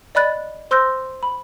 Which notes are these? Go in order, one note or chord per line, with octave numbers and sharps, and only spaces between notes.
D5 D#5 B5 F#6 A6
C5 C6 E6 F#6 G6 A#6
B5